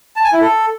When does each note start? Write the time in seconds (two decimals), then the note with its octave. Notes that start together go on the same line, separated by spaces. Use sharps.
0.16 A5
0.24 G#5
0.33 E4
0.41 A4